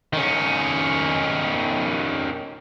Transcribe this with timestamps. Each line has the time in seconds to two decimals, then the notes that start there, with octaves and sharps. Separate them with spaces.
0.13 D#3 C#4